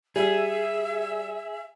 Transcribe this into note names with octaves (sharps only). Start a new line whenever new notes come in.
G3 G#4 E5